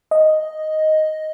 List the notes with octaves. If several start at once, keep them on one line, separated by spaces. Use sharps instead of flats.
D#5